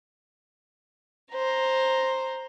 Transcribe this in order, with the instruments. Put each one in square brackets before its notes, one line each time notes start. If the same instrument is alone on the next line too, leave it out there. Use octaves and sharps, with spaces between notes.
[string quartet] C5 A#5